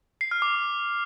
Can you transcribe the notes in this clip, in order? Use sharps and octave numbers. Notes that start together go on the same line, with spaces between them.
C7
F6
D6